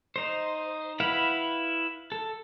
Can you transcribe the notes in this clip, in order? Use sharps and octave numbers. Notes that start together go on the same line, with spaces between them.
D#4 C5
E4 B4 F5 F#5 B5
A4